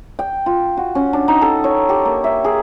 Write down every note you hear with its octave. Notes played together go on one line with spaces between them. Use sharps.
G5
F4
F#4
C#4
D4
D#4
A4
C#5
G4
A#3
E5
G#4